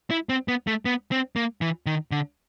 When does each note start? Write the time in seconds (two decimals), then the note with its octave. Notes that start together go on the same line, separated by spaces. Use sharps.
0.11 E4
0.29 C4
0.48 B3
0.67 A3
0.85 B3
1.12 C4
1.36 A#3
1.61 E3
1.86 D#3
2.12 D3